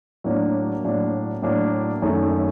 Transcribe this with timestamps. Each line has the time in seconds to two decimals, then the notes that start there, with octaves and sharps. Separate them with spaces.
0.24 A2 F#3 A#3 D4
0.83 A2 F#3 A#3 D4
1.42 A2 F#3 A#3 D4
2.02 F#2 D#3 A3